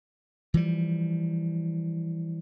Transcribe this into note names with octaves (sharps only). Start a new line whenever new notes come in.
E3 F3 G3